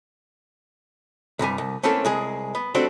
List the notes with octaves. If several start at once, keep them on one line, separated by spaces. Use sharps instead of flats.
C2 G2 G3 G#5
C2
A3 A#3 C4 C#4 E4 A4
C2 G#3 G#4
B3
G3 A3 C4 D4 F#4 C5